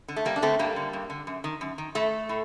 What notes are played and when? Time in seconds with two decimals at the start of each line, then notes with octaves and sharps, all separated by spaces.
0.08 D3
0.16 A3
0.25 G2 G3 A#3
0.36 D4
0.42 D3 A3 C4
0.59 G2 G3 A#3
0.76 D3
0.93 G2
1.10 D3
1.27 F#2
1.44 D#3
1.61 F#2
1.78 D#3
1.95 A2 A3
2.29 A2